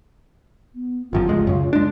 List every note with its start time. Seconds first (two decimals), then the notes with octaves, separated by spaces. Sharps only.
0.75 B3
1.13 G1 F#2 F3 F4
1.29 C#2 G2 G#3
1.47 F#2 C#3
1.73 G#3 D4